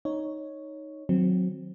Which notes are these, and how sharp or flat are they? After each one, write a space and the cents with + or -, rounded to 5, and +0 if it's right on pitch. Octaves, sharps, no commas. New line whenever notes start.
D#4 +0 C#5 +0
D#3 +0 F#3 -20 C4 +0